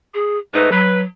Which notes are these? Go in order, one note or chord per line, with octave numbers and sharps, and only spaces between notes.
G#4
G#2 A3 D#4 B4
F#3 B4